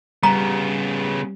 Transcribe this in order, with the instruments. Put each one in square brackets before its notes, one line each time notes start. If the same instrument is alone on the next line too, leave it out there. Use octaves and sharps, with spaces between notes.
[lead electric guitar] C#3 B3 [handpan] G3 [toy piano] A#5